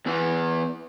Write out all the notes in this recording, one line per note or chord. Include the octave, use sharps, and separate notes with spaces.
E2 E3